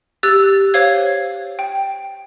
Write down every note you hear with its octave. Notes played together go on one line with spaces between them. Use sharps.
G4 E6 F#6 A6
C5 C#5 F5 G#6
G5